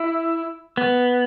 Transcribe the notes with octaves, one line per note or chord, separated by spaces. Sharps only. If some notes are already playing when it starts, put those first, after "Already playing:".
Already playing: E4
B3